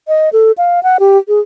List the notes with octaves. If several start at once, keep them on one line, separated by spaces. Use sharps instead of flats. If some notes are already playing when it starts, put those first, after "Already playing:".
D#5
A4
F5
F#5
G4
G#4